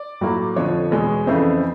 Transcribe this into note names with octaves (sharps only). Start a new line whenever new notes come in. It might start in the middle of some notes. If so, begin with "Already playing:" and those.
Already playing: D5
A2 F#3 A#3
F2 D3 F3 C#5
E2 B2 G#3
F2 C#3 E3 A3 C4 C5